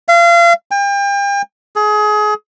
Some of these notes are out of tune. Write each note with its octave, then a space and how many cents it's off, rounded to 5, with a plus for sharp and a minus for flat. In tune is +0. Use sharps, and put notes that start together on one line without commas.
F5 -35
G5 +40
G#4 +25